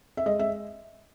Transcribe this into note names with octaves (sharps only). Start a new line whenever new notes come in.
E5
G#3 D#5
E5